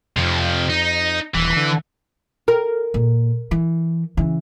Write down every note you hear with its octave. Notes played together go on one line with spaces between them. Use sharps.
F2 C3 F3
D#4
D#1 E3
D3
A#4
A#2
E3
C#3 E3